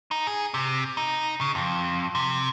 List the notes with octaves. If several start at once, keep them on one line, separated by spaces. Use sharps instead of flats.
D#4
G#4
C3
D#4
C#3
F2
C3